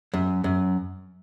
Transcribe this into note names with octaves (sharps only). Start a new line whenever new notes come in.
F#2
F#2